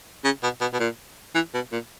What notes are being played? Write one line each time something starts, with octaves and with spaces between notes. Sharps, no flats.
C#3
B2
B2
B2
A#2
E3
B2
A#2